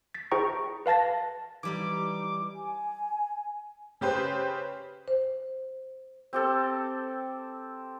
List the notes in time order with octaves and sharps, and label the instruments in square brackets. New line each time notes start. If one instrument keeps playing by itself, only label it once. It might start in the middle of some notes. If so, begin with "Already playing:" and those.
[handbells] A6 B6
E4 G#4 C5 G5 A#5 C#6
B4 F5 A5 A6 A#6
[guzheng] E3 G3 D#4 [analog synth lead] D6
[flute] G#5
[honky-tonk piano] C#3 G4 B4 C5
[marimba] C5
[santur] C4 G4 A4